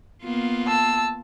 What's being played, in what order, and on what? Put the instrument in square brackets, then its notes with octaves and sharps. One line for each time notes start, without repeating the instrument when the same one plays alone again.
[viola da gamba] A#3 B3 F4
[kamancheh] A5 E6